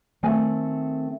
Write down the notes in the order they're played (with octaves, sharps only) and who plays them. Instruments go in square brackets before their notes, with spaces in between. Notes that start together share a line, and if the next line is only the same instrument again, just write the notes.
[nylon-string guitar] D#3 A3 C4 F#5 G#5